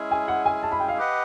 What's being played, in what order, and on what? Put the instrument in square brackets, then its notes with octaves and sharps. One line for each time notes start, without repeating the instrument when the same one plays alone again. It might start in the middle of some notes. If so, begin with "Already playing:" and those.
Already playing: [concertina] G#3 C#4 E4 G#4
[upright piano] G#5
F#5
G#5
A5
B5
G5
F5
[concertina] G4 B4 D#5 F#5